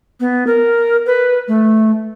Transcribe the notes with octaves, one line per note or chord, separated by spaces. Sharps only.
B3
A#4
B4
A3